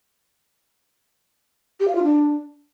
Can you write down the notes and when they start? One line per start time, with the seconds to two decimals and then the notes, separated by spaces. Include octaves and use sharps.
1.80 G4
1.88 F5
1.95 F4
2.03 D4